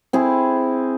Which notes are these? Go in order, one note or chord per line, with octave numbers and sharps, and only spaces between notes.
C4 E4 G#4